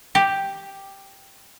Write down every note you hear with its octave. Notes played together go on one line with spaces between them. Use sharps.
G4